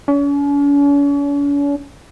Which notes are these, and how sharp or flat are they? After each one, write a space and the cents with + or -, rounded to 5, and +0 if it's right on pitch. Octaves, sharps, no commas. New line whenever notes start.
C#4 +45